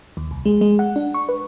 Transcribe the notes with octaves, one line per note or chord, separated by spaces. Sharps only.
D#2
C2
G#3
G#3
F#5
D4
C#6
B4